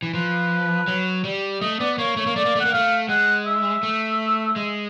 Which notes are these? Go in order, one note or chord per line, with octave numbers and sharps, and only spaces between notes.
E3
F3 B4
F#3
G3
A3 D#5
B3 D5
A#3 C#5
A3 C#5
A#3
A3 D5
A#3
A3
F#5
A#3
A3 F5
G#3 F#5
E5
A3
G#3